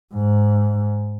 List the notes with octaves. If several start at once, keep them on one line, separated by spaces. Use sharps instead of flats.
G#2